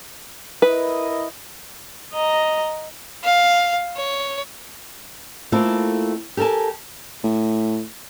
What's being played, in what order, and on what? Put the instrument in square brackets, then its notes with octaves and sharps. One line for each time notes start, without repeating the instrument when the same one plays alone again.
[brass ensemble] E4 A#4 D#5 [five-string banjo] B4
[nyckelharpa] D#5 A#5
[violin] F5
C#5
[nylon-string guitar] A3 A#3 C4 E4 F4 A4
G4 A4 A#4 G#5 A5
[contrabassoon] A2